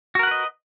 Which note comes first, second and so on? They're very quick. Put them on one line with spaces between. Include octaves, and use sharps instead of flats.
F#4 A#4 F#5 B4 D#5